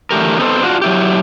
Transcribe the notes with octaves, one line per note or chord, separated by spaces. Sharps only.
D3 E3 A3 G4 A#4
B3 C4 D#4 A4 C5
D4 F4 F#4
F#3 E4 G4